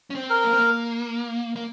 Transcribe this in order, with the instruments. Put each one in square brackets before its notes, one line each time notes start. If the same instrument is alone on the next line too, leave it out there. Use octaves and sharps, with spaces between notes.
[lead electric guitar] C#4
C4
[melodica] A#4
[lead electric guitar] A#3
C4
A#3
A#3